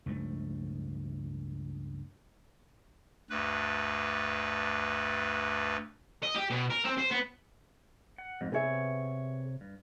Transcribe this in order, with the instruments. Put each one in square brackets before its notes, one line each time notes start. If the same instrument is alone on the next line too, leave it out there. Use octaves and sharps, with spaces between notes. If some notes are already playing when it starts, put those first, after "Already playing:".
[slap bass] C#2 G2 F3 A3
[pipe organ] D2 G2 B4
[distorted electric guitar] D#5
G4
B2
A#4
C4
C5
B3
[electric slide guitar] F#5
F2 G#2
[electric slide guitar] C3 C#5 [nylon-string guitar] B3 G#4 E5
[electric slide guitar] G2